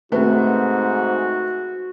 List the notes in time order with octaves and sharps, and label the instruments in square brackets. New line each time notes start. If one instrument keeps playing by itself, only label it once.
[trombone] G#2 [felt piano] C3 A3 B4 [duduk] F#4